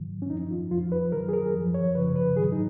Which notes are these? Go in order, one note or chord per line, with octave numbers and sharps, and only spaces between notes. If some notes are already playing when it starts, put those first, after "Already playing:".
Already playing: G#2 D#3 F#3
C#4
F#2 F3 D#4
F4
F2 F3 F4
B4
F#2 D#3 F#3 A#4
G#4
A#4
F#2 F3
C#5
F#2 C#3 F3 B4
B4
G#2 D#3 F#3 G#4
D#4